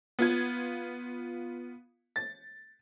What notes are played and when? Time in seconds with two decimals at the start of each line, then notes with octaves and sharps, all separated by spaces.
0.19 B3 F4 G#6
2.16 A6